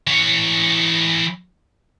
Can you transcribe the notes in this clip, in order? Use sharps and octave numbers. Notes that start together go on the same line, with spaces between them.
E3 C#5